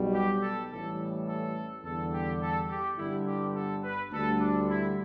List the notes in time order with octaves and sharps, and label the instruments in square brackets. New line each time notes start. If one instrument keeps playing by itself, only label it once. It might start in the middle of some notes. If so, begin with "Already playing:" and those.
Already playing: [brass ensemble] B1 B2 G3
G4
A4
A1 A2 E3 G3 A4
A4
E2 D3 G3 A4
G4
A4
G4
G1 G2 D3 G3 E4
G4
A4
B4
D2 D3 G3 A4
D4
E4